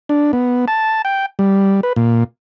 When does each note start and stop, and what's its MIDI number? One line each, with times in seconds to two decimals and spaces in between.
0.09 0.32 62
0.33 0.65 59
0.68 1.02 81
1.05 1.26 79
1.39 1.81 55
1.83 1.93 71
1.96 2.24 46